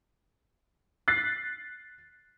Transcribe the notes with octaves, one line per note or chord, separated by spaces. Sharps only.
F#6 A6 B6 C7